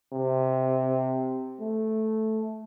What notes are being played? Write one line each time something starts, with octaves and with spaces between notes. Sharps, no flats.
C3
A3